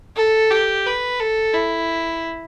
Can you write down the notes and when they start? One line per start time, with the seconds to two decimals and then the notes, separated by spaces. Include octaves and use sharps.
0.16 A4
0.51 G4
0.86 B4
1.20 A4
1.54 E4